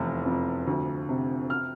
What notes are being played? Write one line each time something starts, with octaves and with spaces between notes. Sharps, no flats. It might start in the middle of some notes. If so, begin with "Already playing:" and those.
Already playing: F1 E2
F2
D2
C3
F6